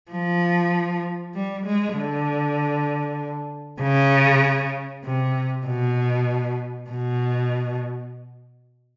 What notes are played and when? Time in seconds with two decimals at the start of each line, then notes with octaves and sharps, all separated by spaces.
0.11 F3
1.35 G3
1.66 G#3
1.96 D3
3.82 C#3
5.04 C3
5.66 B2
6.90 B2